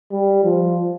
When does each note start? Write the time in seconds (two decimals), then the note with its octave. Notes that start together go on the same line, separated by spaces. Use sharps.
0.12 G3
0.44 F3